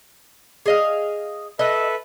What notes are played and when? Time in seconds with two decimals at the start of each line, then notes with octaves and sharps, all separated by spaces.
0.66 G#4 D#5 F5
1.59 A4 B4 D#5 E5 F#5